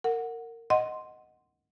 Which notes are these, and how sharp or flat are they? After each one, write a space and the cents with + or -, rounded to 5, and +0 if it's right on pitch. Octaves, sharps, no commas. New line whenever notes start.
A#4 -20 F#5 -10
D#5 +0 F#5 -5 C6 +0